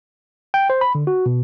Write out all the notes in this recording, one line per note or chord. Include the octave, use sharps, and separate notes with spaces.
G5
C5
B5
D3
F#4
B2